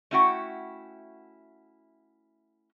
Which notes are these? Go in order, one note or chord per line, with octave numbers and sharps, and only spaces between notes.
A3 C#4 E4 F#4 F#5 G5